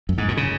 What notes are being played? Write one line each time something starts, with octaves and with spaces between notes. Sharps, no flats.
F#2
G#2
A#2
C#3